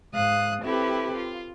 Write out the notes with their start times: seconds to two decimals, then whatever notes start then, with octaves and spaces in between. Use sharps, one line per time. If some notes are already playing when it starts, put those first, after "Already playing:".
0.13 G#2 F5 D#6 F#6
0.62 C4 E4 G4 A4 B4
1.15 F4